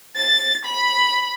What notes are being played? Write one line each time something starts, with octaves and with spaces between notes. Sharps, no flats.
A6
B5